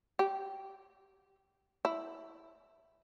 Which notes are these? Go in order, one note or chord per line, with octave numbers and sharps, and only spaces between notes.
G4
E4